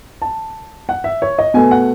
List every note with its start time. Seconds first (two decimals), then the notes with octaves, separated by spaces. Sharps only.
0.22 A5
0.89 F#5
1.04 E5
1.22 C#5
1.38 D#5
1.54 B2 A3 G#5
1.71 F#5